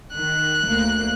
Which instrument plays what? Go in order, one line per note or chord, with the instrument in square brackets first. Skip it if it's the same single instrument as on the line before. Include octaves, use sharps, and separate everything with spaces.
[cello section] D#3 [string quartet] F#6
[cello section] D2 A#3